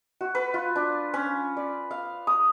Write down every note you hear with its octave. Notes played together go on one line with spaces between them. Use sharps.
F#4
B4
F4
D4
C#4
D5
F5
D#6